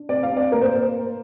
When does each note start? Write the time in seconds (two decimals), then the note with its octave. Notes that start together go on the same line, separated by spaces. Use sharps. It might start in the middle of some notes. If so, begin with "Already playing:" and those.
Already playing: D4
0.09 C3 D5
0.23 F5
0.30 C3
0.37 D5
0.52 A#3 A#4
0.61 C5